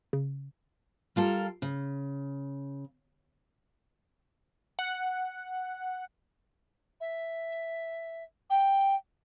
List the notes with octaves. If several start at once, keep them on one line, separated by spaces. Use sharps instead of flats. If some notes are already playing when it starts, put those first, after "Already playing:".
C#3
G3 F4 A4 A#4
C#3
F#5
E5
G5